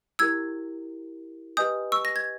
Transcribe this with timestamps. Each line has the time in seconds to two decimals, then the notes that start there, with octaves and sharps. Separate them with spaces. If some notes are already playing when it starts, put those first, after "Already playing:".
0.19 E4 G4 A#4 E6 G#6
1.57 G4 B4 D#5 G#5 D#6 G6
1.92 C#6 E6
2.05 A#6
2.16 G#6